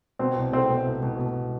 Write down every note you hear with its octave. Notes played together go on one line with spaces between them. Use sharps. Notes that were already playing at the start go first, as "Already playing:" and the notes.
B2 C4
C2
A3 C4
B2
C2
B2
B2